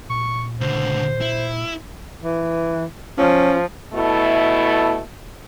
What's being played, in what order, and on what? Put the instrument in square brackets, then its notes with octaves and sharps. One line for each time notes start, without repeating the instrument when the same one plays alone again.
[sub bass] A#2 [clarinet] C#6
[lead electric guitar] C#2 D3 [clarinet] C5
[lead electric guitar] E4
[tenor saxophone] E3
[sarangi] F3 [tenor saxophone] C#4
[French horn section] B2 A3 E4 A4